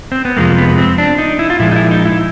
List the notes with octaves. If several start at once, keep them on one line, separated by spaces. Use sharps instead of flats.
C4
B3
F2 C3 F3 G#3 A#3
B3
C4
D4
D#4
E4
F4
A#2 F3 G#3 E4
D#4
E4
D#4
E4